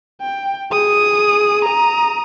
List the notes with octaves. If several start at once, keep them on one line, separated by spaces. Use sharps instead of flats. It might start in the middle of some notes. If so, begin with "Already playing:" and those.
G5
G#4 D#6
A#5 D#6